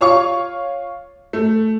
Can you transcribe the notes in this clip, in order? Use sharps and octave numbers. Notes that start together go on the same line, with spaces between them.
F4 C#5 F5 C#6
A3